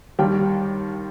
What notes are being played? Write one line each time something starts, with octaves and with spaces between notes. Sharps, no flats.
D#2 D#3 G3 G5